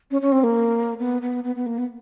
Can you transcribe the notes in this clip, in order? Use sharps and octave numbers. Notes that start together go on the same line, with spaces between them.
C#4
C#4
C4
A#3
B3
B3
B3
B3
A#3
B3